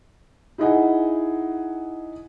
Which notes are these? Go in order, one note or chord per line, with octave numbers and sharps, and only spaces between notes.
D#4 E4 G#4 D#5 F#5 G#5